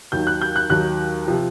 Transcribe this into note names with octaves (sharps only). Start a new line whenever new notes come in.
D#2 D#3 F#3 G6
F#6
G6
F#6
D#2 D#3 F#3 F#6
C3 F3